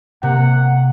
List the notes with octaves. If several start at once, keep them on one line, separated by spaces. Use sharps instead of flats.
C3 A#3 F#5